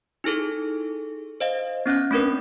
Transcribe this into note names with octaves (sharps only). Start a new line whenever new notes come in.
D#4 E4 G#4 A4
C5 D#5 F5
B3 C#4 F#6 G6
A3 C4 D4 A#4 B4